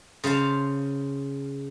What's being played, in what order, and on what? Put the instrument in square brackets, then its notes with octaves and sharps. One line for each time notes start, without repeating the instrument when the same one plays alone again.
[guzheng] C#3 C5 F5 A5